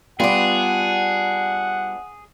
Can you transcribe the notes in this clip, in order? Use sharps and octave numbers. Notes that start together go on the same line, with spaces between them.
G3 B3 D4 F4 G#4 F#5